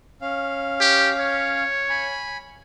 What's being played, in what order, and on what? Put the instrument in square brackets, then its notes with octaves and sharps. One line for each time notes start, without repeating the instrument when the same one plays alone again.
[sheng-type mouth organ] C#4 F5
[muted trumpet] G4
C#5
[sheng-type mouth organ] G#5 B5